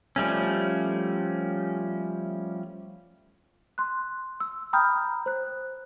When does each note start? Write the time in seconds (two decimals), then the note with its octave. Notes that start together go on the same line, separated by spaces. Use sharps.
0.16 F3 G3 A3 C#4
3.78 C6 F#6
4.40 E6
4.73 G5 A#5 B5 D#6 F6 G6
5.26 C5 F#6